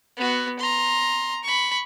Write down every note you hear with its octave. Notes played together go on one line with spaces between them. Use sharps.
B3 F#4
A#5 C6
B5 C#6